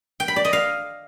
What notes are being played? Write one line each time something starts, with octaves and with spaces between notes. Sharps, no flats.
G5
B5
D5
D#5
F5